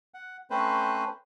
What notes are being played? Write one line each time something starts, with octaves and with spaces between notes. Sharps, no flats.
F#5
A3 C4 C#4 B4 C5